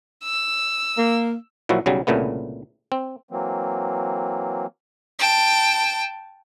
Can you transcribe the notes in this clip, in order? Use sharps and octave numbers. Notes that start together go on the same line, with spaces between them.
E6
A#3
A#2 F3 F#3 E4 F#4
B1 C#3 F#3 G3
C2 A#2 C#3 A3 B3
C4
E3 F#3 A#3 C4
G5 A5